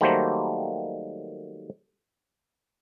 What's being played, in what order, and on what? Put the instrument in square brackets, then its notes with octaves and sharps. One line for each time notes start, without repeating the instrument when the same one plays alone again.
[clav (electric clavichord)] D#3 F#3 G3 A3 A#3 C5